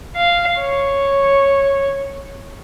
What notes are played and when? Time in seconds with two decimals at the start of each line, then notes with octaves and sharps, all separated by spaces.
0.16 F5
0.60 C#5